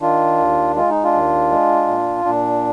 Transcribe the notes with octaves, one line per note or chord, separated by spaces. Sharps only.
D#3 D4 F4
D#2
G#3 F4
D#4
D4 F4
D#2
G#3
A#2
A#2 D4